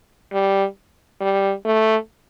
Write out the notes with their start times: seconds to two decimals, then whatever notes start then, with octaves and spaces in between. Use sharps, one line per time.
0.33 G3
1.21 G3
1.66 A3